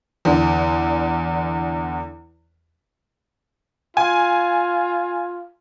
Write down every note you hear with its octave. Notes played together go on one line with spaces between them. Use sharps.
E2 D3
F4 G#5